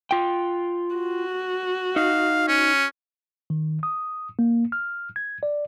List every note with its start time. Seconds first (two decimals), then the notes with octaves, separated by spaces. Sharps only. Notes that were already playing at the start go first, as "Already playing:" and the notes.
0.11 F4 G5
0.95 F#4
1.96 D#4 F5
2.48 C#4
3.50 D#3
3.83 D#6
4.39 A#3
4.72 F6
5.16 G#6
5.43 D5